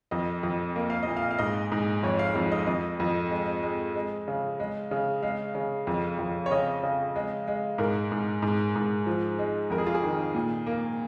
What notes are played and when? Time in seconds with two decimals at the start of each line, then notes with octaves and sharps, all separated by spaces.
0.11 F2 D#5
0.43 F2
0.76 A#3
0.90 F5
1.03 A#2 D#5
1.17 F5
1.31 F5
1.39 G#2 D#5
1.72 G#2
2.03 F2 C#5
2.19 F5
2.35 F2 F5
2.52 D#5
2.67 F2 D#5
3.00 F2
3.31 G#3
3.63 G#3
3.96 G#3
4.28 C#3
4.60 G#3
4.91 C#3
5.22 G#3 F5
5.55 C#3
5.87 F2
6.19 F2
6.46 C#5
6.51 C#3 D#5
6.83 C#3
7.16 G#3
7.47 G#3
7.78 G#2 A#4
8.12 G#2
8.42 G#2
8.76 G#2
9.06 F3
9.39 G#3
9.70 F2 A#4
9.78 G#4
9.87 F4
9.94 G#4
10.03 D#3
10.35 A#2
10.66 A#3